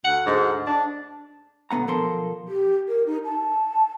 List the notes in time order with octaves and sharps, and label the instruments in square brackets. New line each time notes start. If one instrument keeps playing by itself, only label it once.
[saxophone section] D2 F#5
D2 G#2
D4
[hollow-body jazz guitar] B1 D3 B3 F#5 A#5
B1 F3 A4 A#4 C6
[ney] G4
A#4
D#4
A5